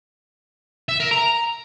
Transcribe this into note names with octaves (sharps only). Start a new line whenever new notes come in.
E5
A#4
A#5